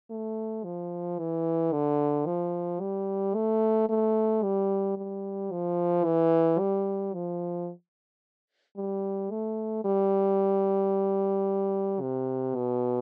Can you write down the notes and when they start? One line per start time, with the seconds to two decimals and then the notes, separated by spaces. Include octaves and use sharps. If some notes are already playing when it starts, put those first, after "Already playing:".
0.11 A3
0.64 F3
1.19 E3
1.73 D3
2.26 F3
2.80 G3
3.35 A3
3.89 A3
4.43 G3
4.97 G3
5.51 F3
6.05 E3
6.59 G3
7.14 F3
8.77 G3
9.30 A3
9.84 G3
12.01 C3
12.55 B2